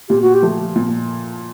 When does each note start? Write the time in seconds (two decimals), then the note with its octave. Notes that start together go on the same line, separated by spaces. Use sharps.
0.09 A#2 G4
0.22 F#4
0.34 G4
0.42 F3 A3
0.76 A#2